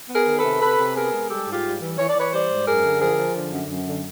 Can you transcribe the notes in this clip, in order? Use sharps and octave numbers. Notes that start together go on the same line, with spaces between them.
B3
G#4 A#4
D#3
A4 B4
C3
C3 A4 B4
C3
B3 G#4 A#4
G#3
G3 G4 A4
G#2
F4 G4
G3
E3
E3 C#5
D5
E3 B4 C#5
G3 C5 D5
G#2
F#2 G#4 A#4
D3
F3 G#4 A#4
F3
D3
F#2
F#2
D3